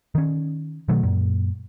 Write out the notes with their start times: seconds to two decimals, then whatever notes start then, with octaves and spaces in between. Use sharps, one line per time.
0.15 D#3 C#4
0.89 B2 D#3 F#3 A3
1.03 F#2 A#2